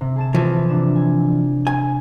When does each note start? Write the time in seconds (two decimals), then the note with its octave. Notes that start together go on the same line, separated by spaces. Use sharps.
0.01 C3
0.16 G#4 A5 E7
0.35 E3 F3
0.69 C3 D4 E7
0.96 G#5
1.67 G#5